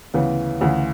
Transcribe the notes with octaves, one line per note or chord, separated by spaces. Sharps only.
D2 C#3 E3 B3
D2 C#3 E3